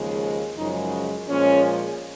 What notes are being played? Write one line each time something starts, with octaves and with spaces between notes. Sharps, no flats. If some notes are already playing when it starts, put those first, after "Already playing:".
Already playing: D#2 C#3 F3 G#3
F#2 C#3 F3 G#3 D#4
A#2 F3 G#3 C#4